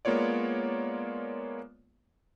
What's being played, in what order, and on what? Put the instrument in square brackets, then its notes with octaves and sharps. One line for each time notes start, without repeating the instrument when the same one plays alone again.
[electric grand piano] G#3 A#3 B3 F4 C#5 D5